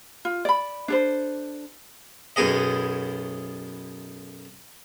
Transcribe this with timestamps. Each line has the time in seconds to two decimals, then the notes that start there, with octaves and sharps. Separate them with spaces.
0.25 F4
0.45 D5 B5
0.88 D4 A4 C5
2.36 B1 F#2 B3 G#4 D#5